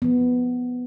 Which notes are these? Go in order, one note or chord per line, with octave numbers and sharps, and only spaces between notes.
F3 B3